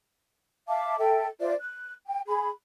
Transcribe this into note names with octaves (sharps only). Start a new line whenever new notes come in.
E5 F5 A5 D6
A4 E5 G5
F4 C5 D5 E5
F#6
G5
G#4 B5